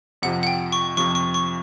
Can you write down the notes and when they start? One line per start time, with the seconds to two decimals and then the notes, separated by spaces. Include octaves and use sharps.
0.22 F2 C3 F3 F#5
0.43 F#5
0.47 G5
0.72 C#6
0.97 F2 C3 F3 C#6
1.15 C#6
1.34 C#6